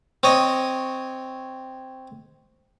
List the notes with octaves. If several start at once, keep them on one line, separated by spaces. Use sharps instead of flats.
C4 C#5 D#5